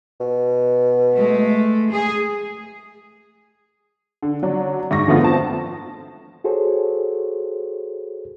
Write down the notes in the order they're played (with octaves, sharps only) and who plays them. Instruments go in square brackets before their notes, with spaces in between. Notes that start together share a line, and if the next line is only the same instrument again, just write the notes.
[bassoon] B2
[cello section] G#3 A3
G#4
[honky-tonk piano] D3
F#3 D4
G#2 C#6 A#6
D3 F3 A3 B3 F4
C4 A5
[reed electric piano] F#4 G#4 A4 C5 C#5